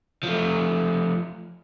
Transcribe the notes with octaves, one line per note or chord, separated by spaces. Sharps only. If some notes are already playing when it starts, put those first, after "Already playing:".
F3 A3